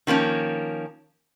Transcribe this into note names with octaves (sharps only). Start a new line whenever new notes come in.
D#3 F3 A#3 C#4